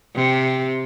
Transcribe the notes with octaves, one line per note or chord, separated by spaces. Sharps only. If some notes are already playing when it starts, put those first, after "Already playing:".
C3